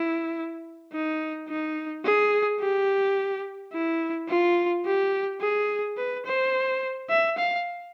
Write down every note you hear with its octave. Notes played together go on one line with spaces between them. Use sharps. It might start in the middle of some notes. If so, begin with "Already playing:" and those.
Already playing: E4
D#4
D#4
G#4
G4
E4
F4
G4
G#4
B4
C5
E5
F5